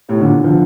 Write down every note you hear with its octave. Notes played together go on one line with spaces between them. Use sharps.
A2 C3
A#2 D3
D3 F3